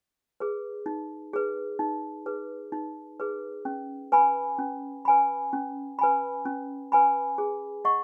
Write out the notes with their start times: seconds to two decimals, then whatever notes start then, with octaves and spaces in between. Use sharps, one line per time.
0.40 G#4 B4
0.86 D#4
1.33 G#4 B4
1.79 D#4
2.26 G#4 B4
2.72 D#4
3.20 G#4 B4
3.65 C#4
4.12 B4 G#5 B5
4.59 C#4
5.05 B4 G#5 B5
5.53 C#4
5.99 B4 G#5 B5
6.45 C#4
6.92 B4 G#5 B5
7.38 G#4
7.85 D#5 F#5 C#6